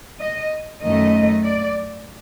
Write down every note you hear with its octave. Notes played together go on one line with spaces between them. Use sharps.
D#5
F#2 D#3 A3 D#5
D5